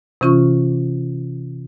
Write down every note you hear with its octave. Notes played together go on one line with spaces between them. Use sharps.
C3 E3 C#4 F4 C#6